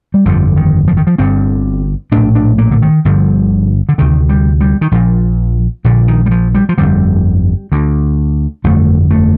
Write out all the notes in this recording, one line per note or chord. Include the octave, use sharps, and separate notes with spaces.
G3
G1 F2 D3 F3
D#3
F3
D#3
F3
G1 G2 D3 C4
A#1 A2 D4
D4
A#3
D3
D#3
G1 G2 D3 F3
D3
D2 C3 D#3
G3
G3
D#3
A#1 A#2 F3
A#1 A#2 D3
D#3
G3
F3
G3
F3
G1 F2 D3 G3
D2 D3
G1 F2 D3 A3
A3